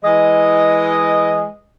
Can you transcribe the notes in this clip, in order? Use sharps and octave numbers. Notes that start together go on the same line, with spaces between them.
E3 G#3 D#5